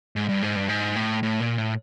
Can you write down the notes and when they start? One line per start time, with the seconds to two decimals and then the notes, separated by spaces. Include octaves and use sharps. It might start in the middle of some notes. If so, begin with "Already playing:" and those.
0.16 G#2
0.29 G2
0.42 G#2
0.56 G2
0.69 G#2
0.96 A2
1.23 A2
1.40 A#2
1.58 A2